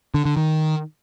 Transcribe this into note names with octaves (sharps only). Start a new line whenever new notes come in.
D3
D3
D#3